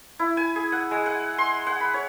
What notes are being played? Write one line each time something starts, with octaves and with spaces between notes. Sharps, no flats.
E4
G#5
G#4
F#5
G#3
F#5
C6
F#5
B5
C#5